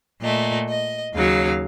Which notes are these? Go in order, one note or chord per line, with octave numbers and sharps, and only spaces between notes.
A#2 A3 D#5
D#5
D#2 C#3 F#3 F5